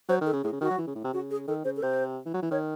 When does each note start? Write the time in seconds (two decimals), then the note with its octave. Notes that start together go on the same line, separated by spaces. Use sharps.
0.09 F#3 C5
0.21 D#3
0.26 A4
0.33 C#3
0.43 A2 G#4
0.53 C#3
0.61 D#3 F#4
0.70 F#3
0.78 E3
0.87 C#3
0.95 A2
1.04 C3
1.13 C#3 F#4
1.31 G#4
1.48 D#3 A4
1.65 C#3 C5
1.77 A4
1.82 C3 C5
2.25 E3
2.34 F#3
2.43 E3
2.51 D#3 C#5